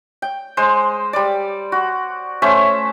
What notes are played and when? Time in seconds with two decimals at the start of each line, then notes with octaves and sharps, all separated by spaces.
0.22 G5
0.57 G#3 C5
1.13 G3 D5
1.72 F#4
2.42 A3 C#4 C5 E5